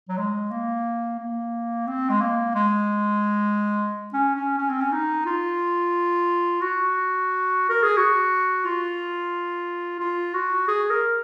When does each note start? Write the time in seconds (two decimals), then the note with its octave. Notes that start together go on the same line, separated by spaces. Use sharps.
0.09 F#3
0.18 G#3
0.51 A#3
1.19 A#3
1.87 C4
2.10 G#3
2.21 A#3
2.55 G#3
4.13 C#4
4.36 C#4
4.58 C#4
4.70 C4
4.81 C#4
4.92 D#4
5.26 F4
6.61 F#4
7.69 A#4
7.83 G#4
7.97 F#4
8.65 F4
10.00 F4
10.34 F#4
10.68 G#4
10.90 A#4